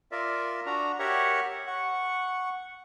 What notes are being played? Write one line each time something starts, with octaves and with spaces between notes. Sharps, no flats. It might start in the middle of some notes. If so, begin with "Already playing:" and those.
F4 A#4 D5 E5
D4 F#4 A#5
G4 A#4 C#5 E5 F#5 C#6
F#5 C#6